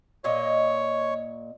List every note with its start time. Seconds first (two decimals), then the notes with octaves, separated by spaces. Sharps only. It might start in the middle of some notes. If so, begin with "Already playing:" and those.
0.24 A#2 A#3 C#5 D#5